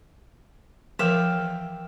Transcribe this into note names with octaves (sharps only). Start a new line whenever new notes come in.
E3 F3 A#4 E5 F5 G5